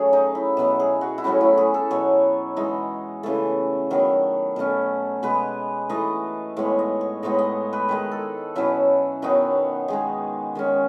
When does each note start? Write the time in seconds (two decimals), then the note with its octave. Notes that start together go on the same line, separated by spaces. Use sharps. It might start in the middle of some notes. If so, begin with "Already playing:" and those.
Already playing: F#3 A3 C#4 G#4
0.13 D#4
0.35 E4
0.57 B2 F#3 B3
0.80 G#4
1.01 F#4
1.18 E4
1.24 A2 F#3 A3 C#4 F#4
1.41 E4
1.58 G#4
1.74 A4
1.91 B2 F#3 B3 C#5
2.56 E3 G#3 D#4
3.23 C#3 E3 A3 A4
3.91 D#3 F#3 B3
4.56 B2 A3 C#4
5.23 B2 G#3 B3 B4
5.89 E3 A3 D#4 D#5
6.57 A2 G#3 B3 C#5
6.79 D#5
7.01 C#5
7.23 A2 G#3 B3 D#4 D#5
7.39 D#5
7.73 B4
7.88 D#3 G#3 D#4 B4
8.11 A4
8.55 B2 F#3 C#4 E4
9.22 D#3 F#3 B3 D#4 F#4
9.88 D#3 G#3 D#4 G#4
10.55 D#3 G#3 C#4